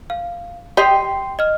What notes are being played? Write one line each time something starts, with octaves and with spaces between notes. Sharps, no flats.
F5
G4 D#5 G5 C6 C7
D#5 F6